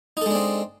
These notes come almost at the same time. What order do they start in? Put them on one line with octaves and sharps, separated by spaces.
D#4 A4 G#3 D4 C4